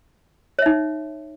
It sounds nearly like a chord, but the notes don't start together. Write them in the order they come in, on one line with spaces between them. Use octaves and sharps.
C#5 E5 D#4